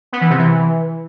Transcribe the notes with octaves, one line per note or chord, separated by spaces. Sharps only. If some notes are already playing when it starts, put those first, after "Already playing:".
B3
E3
C3
E3